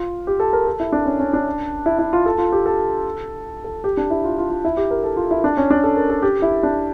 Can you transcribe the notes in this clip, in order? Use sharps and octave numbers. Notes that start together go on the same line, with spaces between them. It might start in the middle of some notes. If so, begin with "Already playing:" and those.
Already playing: F4
G4
A4
A#4
A4
E4
D4
C#4
C#4
D4
E4
E4
F4
A4
F4
G4
A4
A4
G4
D4
E4
F4
F4
F4
E4
G4
A#4
A4
F4
E4
D4
C#4
D4
A4
A#4
A4
G4
E4
D4